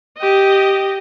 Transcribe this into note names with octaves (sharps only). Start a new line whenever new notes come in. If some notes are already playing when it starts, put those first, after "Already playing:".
G4 D#5